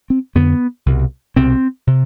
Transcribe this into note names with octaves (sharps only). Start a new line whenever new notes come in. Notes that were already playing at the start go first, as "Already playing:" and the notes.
C4
F2 D3 B3
C2 B2
C2 B2 C4
C3